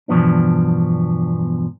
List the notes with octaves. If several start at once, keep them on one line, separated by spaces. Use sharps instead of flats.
E2 G2 B2 F3 B3 D4